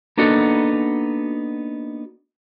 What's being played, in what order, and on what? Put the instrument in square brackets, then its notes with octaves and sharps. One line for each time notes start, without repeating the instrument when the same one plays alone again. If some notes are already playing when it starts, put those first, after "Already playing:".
[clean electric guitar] A#3 B3 D4 D#4 F#4 A4